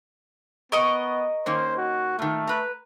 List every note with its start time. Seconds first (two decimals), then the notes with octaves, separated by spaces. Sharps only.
0.72 B3 A#4 D#5 C#6
1.46 D#3 A#3 C#4 C5
1.77 F#4
2.19 A#2 D#3 A3
2.47 B4 A#5